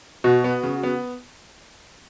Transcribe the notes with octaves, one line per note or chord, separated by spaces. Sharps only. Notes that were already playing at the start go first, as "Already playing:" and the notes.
B2 F#4
B3
C#3
B3